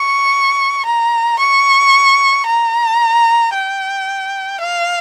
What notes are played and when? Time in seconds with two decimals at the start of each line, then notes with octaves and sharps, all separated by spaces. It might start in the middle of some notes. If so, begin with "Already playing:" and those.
Already playing: C#6
0.86 A#5
1.40 C#6
2.46 A#5
3.54 G5
4.61 F5